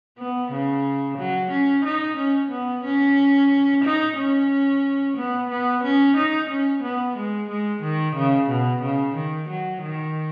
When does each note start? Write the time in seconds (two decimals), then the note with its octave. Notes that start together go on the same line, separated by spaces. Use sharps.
0.18 B3
0.51 C#3
1.18 F#3
1.51 C#4
1.85 D#4
2.17 C#4
2.51 B3
2.84 C#4
3.84 D#4
4.17 C#4
5.17 B3
5.50 B3
5.83 C#4
6.16 D#4
6.50 C#4
6.83 B3
7.17 G#3
7.49 G#3
7.82 D#3
8.16 C#3
8.50 B2
8.82 C#3
9.16 D#3
9.49 F#3
9.82 D#3